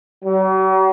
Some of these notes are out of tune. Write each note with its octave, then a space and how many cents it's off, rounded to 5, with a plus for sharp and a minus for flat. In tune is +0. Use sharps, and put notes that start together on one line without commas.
F#3 +45